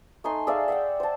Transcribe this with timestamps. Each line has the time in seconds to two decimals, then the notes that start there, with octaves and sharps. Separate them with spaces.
0.24 A3 D#4 G#5 C6
0.47 G#4 D5 E5 F5
0.68 E5 F#5 G5
1.00 C5 A5